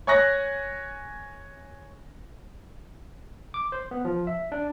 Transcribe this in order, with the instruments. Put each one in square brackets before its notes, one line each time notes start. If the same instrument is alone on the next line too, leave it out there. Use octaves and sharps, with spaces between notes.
[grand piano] C#5 G#5 C#6 F#6 A#6
[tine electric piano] D6
C5
B3
F3
E5
D4